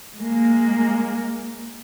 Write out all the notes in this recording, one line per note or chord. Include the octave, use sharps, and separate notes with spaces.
G#3 A#3